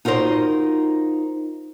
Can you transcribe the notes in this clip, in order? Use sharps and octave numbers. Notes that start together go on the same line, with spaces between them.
D#4 F4 F#4 A#4 C5